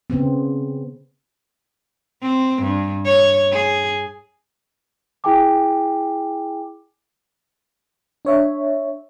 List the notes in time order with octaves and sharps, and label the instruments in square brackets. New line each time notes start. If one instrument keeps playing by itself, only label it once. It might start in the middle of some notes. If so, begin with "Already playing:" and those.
[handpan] C#3 B3 C4
[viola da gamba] C4
G2
C#5
G#4
[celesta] E4 G#4 G5 G#5 D6
[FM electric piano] D4 C#5 E5